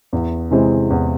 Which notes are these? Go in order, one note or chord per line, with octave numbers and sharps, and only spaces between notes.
E2
C3 E3 G#3 C4
E2